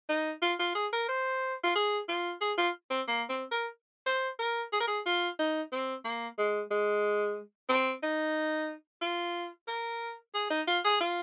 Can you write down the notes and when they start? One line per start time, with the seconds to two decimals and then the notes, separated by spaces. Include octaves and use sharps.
0.09 D#4
0.42 F4
0.59 F4
0.75 G#4
0.93 A#4
1.08 C5
1.63 F4
1.75 G#4
2.08 F4
2.41 G#4
2.57 F4
2.90 C4
3.08 A#3
3.29 C4
3.51 A#4
4.06 C5
4.39 A#4
4.73 G#4
4.80 A#4
4.88 G#4
5.06 F4
5.39 D#4
5.72 C4
6.05 A#3
6.38 G#3
6.71 G#3
7.69 C4
8.03 D#4
9.01 F4
9.68 A#4
10.34 G#4
10.50 D#4
10.67 F4
10.84 G#4
11.00 F4